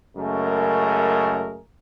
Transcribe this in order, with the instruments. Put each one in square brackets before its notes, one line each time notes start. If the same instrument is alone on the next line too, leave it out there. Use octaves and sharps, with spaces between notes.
[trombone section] F#2 C#3 G#3 A3 G#4 A#4